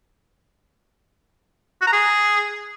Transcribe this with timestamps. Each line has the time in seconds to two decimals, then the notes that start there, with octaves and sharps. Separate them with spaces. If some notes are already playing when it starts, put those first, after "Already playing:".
1.81 F#4
1.87 A#5
1.93 G#4